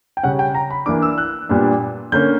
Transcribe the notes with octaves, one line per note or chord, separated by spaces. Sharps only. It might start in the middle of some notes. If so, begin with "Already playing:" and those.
G5
C#3 G3 C#4 F#5
G5
A#5
B5
E3 A#3 D4 D6
E6
F#6
A#2 G3 B3 D4
D3 A#3 C#4 G6